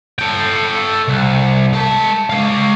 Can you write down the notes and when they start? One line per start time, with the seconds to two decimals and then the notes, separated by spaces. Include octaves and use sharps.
0.19 A4 G5
1.08 C2
1.73 G#3 A5
2.30 G#3 F5